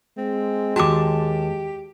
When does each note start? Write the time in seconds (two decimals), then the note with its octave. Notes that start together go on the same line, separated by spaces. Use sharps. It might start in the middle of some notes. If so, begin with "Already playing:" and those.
0.18 G#3 C4
0.76 D#2 G#2 F#4 G4 A5 D6